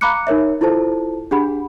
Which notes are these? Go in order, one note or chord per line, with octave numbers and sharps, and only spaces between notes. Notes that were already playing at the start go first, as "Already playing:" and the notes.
F5 A#5 B5 D6 F#6 C#7
D#4 A#4 C#5 E5
E4 F4 A4 C5 A5
D4 G4 G#4 F#5 B5